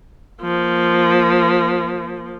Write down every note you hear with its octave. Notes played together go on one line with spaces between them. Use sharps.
F3 A#3